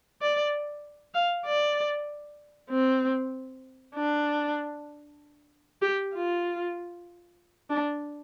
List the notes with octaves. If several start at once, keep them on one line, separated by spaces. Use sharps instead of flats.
D5
F5
D5
C4
D4
G4
F4
D4